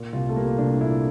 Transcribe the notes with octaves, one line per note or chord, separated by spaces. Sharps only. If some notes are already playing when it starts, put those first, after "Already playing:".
Already playing: A#2
C2 F4
A3
G3 A#3
C2 D4
A#2 E4